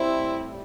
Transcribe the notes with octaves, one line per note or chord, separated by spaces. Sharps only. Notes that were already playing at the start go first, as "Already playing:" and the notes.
Already playing: G3 C4 E4
A2
G3